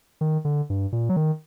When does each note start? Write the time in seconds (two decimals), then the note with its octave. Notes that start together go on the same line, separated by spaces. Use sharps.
0.21 D#3
0.45 D3
0.70 G2
0.92 A#2
1.09 F#3
1.16 D#3